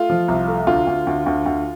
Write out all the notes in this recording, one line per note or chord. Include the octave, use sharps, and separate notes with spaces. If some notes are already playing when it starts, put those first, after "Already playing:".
Already playing: A3 F4
F3
C2
A3
D2 F4
D2
D2
D2
D2